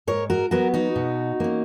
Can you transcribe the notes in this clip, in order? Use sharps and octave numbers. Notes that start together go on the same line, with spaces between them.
G#2 A#4 C#5
F#4 A#4
F#3 B3 F#4 A#4
D#4 F#4
B2
A#3 C#4